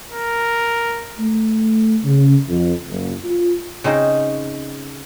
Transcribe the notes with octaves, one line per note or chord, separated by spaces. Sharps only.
A#4
A3
C#3
F2
F#1
F4
C#3 C4 D#4 G#4 C5